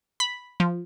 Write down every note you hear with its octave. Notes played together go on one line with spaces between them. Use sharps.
B5
F3